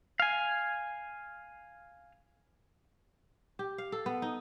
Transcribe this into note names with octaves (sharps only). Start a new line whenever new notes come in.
F5 G#5
G4
F5
A4
B3
D#4